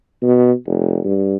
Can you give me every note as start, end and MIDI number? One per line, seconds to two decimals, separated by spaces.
0.22 0.52 47
0.66 0.99 29
1.04 1.36 43